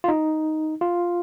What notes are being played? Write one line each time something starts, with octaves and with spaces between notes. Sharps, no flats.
F4
D#4
F4